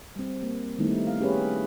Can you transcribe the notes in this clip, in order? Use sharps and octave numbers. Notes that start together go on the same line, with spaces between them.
G3 C4
A#3
D#3 G3 A3 B3 D#4 E4
F5
C#4 G4 G#4 B4 C#5